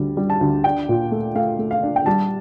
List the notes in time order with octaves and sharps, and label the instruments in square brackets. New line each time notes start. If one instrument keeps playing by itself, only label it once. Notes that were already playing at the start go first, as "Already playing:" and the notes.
Already playing: [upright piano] D2 G3
G3
A5
D2
D4 G5
A#2
A3
A3 F5
A3
F5
D4
G5
G3 A5